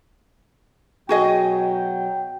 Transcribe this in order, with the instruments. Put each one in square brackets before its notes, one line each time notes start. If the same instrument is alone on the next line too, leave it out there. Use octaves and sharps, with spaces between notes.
[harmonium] B2 F#3 [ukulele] F#4 G#4 D#5 [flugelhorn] G5